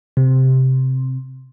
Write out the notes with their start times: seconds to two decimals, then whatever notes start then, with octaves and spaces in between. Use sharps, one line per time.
0.17 C3